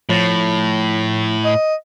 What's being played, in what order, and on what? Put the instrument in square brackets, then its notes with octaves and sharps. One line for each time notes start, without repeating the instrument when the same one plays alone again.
[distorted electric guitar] A2 [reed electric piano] F3 C#5 A6
[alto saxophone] D#5